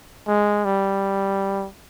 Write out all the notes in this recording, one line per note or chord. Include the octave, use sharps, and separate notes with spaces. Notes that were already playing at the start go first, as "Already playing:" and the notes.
G#3
G3